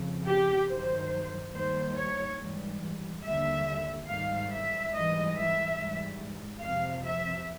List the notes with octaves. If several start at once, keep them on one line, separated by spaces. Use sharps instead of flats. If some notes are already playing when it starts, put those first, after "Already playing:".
Already playing: F2 C#3 F3
G4
G2 D#3 F#3 C5
D#2 D#3 G3 C5
C#5
G#2 E3 G3
D#2 D3 G3 E5
G#2 D#3 G3 F5
E5
G#2 E3 G3 D#5
E5
G#2 E3 G3
F2 C3 F3 F5
E5